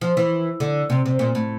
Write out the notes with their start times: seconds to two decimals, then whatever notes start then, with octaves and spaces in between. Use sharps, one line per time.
0.01 F3
0.17 E3
0.60 D3
0.90 C3
1.06 C3
1.19 A#2
1.35 A2